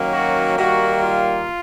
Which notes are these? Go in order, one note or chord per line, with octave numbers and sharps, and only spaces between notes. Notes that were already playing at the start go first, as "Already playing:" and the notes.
Already playing: D#3 F#3 A#3 C#4
F#4
D#3 G3 A#3 F#4
F4